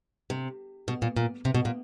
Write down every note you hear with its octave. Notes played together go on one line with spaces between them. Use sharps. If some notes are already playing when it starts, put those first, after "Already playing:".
C3
B2
A#2
A#2
C3
B2
A#2